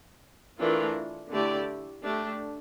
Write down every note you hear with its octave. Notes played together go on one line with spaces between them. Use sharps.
E3 A3 D4 F4 A#4
D3 A3 E4 G4 D5
A3 D4 G4